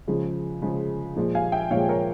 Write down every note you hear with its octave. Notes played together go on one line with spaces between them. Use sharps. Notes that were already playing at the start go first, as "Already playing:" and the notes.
C#3 F3 G#3
C#3 F3 G#3
A#2 F3 G#3
F5 G#5
E5 G5
A#2 F3 G#3 C#5 F5
A#4 C#5